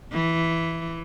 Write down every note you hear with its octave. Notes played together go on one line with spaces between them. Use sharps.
E3